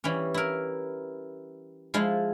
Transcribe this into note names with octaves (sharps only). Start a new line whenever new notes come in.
E3 G3 C#4
E4 A#4
F3 G#3 E4 F4